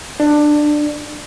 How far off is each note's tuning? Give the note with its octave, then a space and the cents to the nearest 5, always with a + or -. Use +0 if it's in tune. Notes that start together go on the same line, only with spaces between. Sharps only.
D4 +15